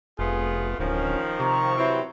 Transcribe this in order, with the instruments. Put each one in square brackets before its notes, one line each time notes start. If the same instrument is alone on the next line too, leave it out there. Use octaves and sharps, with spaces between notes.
[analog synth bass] F1 [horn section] A3 B3 F4 [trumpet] G#4
[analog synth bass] D1 [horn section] D#3 F3 [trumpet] C#4
[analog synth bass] C3 [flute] A#5 [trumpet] C#6
[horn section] E3 F#3 C4 [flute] E4